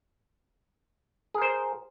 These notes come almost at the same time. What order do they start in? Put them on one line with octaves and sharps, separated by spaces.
G#4 A#4 C5